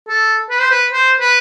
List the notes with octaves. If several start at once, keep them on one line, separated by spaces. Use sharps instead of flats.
A4
B4
C5
B4
C5
B4